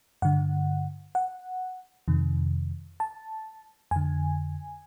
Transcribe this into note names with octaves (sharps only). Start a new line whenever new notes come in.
G2 D3 F#5
F#5
F2 C3 D#3
A5
F2 D3 G#5